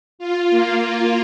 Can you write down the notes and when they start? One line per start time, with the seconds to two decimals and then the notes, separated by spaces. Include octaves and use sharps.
0.19 F4
0.50 A#3